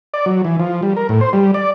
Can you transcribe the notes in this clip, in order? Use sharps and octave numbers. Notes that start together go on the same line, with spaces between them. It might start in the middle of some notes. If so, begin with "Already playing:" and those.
D5
F#3
E3
F3
G3
A#4
A2
C5
G3
D5